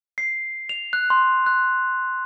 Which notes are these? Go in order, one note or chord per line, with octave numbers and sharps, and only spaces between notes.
C7
F7
F#6
C6
F#6